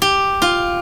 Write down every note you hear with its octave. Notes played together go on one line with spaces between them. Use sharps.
G4
F4